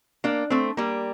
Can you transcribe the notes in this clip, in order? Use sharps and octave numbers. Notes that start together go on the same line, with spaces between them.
A#3 D4
A3 C4
G3 A#3